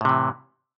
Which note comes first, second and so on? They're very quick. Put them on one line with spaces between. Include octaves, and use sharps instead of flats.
A2 C3 E3